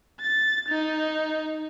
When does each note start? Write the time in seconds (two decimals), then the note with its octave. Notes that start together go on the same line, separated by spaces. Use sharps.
0.21 A6
0.69 D#4